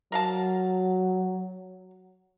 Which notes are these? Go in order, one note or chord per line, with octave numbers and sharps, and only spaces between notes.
F#3 A#4 F5 A5